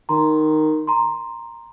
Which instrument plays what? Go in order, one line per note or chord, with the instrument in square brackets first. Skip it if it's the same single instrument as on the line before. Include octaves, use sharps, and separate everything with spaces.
[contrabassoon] D#3 [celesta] A#5 C6
[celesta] A#5 C6